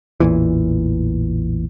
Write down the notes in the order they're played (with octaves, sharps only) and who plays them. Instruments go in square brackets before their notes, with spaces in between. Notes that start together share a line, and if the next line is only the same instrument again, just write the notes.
[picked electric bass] A1 E2 A#2 E3